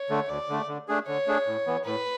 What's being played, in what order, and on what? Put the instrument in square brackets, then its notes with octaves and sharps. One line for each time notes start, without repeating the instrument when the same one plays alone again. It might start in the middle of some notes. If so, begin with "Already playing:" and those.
Already playing: [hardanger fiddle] C#5
[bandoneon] D3 A3
[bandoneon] D2 [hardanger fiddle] D5
[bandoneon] D3 A3
D3
A3 D4 G#4
[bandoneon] D3 [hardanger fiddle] C#5
[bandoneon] A3 D4 G#4
A2
E3 B3
[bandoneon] A2 [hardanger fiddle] B4